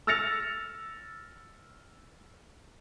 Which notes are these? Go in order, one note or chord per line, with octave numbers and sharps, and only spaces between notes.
E6 F6 A6 A#6 C#7 F7